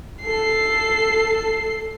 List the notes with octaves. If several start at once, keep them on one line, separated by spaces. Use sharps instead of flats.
A4 C7